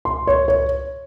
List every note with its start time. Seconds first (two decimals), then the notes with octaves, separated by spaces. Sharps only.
0.05 C6
0.27 C#5
0.48 C#5